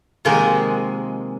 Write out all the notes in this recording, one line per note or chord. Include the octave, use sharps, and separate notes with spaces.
C3 D#3 F3 G#3 A#3